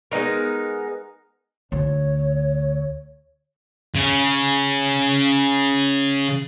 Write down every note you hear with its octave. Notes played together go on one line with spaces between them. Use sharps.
G#3 B3 D#4 A#4
D2 C#5
C#3 C#4